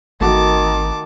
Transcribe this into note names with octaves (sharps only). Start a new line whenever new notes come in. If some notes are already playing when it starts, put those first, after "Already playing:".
G#1 D#3 A3 F#4 A#4 A5 D6